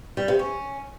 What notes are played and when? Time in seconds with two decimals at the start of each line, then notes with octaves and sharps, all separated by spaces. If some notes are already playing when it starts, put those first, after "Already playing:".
0.17 G3
0.28 C3
0.39 C#4